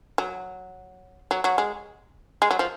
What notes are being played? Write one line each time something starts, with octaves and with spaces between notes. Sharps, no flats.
F#3
F#3
F#3
G#3
G#3
F#3
F3